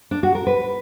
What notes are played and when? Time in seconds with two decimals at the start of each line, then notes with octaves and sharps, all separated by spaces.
0.11 D4
0.23 F#4
0.35 A#4
0.47 B4